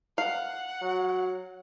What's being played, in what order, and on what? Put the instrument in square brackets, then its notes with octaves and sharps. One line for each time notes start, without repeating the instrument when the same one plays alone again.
[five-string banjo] F5 [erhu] F#5
[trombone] F#3